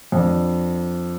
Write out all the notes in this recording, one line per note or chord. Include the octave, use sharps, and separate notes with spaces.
F2 D4